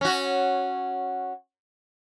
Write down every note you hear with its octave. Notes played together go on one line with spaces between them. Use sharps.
C#4 F#4